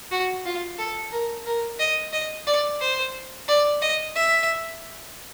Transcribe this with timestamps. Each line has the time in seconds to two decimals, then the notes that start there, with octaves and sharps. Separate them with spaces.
0.11 F#4
0.45 F4
0.78 A4
1.12 A#4
1.46 A#4
1.80 D#5
2.13 D#5
2.47 D5
2.80 C5
3.48 D5
3.81 D#5
4.15 E5